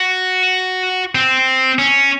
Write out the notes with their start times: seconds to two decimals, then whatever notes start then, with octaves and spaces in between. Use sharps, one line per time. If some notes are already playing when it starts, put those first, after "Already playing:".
Already playing: F#4
1.15 C4
1.79 C#4